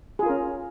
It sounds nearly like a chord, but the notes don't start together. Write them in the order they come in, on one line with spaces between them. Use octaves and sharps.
G#4 F4 A#4 C#4